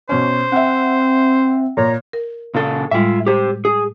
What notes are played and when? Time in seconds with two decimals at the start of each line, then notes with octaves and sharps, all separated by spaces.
0.09 B2 C#4 C5
0.52 C4 E5 F#5
1.77 A#2 C#5 A#5
2.13 A#4
2.55 A#2 C#3 A4
2.91 A2 G3 G#3 F4 E5
3.27 G4 C5
3.65 G#4